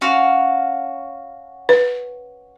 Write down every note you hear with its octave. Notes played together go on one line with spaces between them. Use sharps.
C#4 F#4 F5
B4